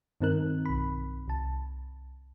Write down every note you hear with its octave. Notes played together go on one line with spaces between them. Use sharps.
G2 D#3 C4 D#4 A#4 F#6
B1 B5
C2 A5